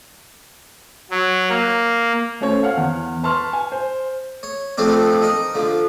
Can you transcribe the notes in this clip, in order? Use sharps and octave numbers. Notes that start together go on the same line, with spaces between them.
F#3
A#3
A3 C#4 A4 C5 C#5
F5 F#5 F6
E2
B4 A5 C6 C#6 F6
G#5
C5
C#5
F3 A3 C4 D4
D#4 A#4
D3 F3